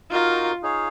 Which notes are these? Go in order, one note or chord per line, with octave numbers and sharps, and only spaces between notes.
D#4 F4 F#4 A#4
D#4 G#4 C#5 F5